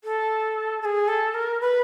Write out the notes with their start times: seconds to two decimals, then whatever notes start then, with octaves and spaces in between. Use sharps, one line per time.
0.04 A4
0.82 A4
0.85 G#4
1.08 A4
1.34 A#4
1.61 B4